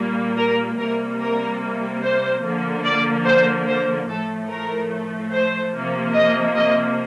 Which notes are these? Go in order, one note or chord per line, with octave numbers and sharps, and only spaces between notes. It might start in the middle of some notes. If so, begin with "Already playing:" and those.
Already playing: A#2 G3 A#3
A#4
C3 G3 A#3 A#4
A#4
C5
D3 F3 A#3
D5
C5
C5
A2 F3 A3 A4
A#4
C5
C3 F3 A#3
D#5
D#5